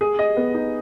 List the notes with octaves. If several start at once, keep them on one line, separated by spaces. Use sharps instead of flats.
G#4
D#5
B3
D#4